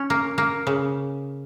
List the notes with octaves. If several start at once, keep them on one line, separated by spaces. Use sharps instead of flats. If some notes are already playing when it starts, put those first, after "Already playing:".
Already playing: C#4
A#3
A#3
C#3